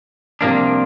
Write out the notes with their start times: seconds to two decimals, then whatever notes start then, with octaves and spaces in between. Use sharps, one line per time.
0.41 C2 C3 F3 A#3 D4